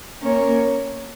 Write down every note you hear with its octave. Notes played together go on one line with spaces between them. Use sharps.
A#3 C#4 A#4 C#5